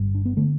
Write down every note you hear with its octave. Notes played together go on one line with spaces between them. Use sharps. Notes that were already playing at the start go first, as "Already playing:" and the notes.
Already playing: G1 G2
D4
B3
D3 A3